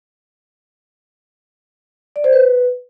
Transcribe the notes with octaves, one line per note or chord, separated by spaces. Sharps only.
D5
C5
B4